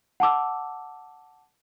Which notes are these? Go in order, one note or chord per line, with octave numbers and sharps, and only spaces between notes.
F#5 A5 D6 E6